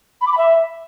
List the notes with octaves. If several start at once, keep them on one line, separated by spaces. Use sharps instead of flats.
B5
D6
B5
E5